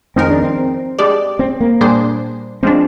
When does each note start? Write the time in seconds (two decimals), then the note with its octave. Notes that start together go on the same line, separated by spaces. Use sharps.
0.16 F2 D#3 G#3 C4 D#4 A#4
0.30 D4
0.42 C4
0.99 G#3 D4 G4 D5
1.39 C4
1.60 A#3
1.81 A#2 G3 D4 G#4 C5
2.63 F3 G#3 C4 D4